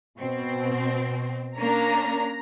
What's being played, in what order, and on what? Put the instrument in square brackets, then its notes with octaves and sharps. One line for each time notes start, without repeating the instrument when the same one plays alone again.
[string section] B2 [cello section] C4
[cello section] A#3 C#4 D4 [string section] A#5